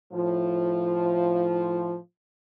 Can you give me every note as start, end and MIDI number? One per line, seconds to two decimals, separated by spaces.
0.12 1.96 45
0.12 1.96 53